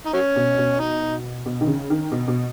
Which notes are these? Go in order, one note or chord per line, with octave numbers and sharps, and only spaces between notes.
D#4
F#3 C#4
B2
B2
D#4
B2
D#3
C#3
D#3
B2
B2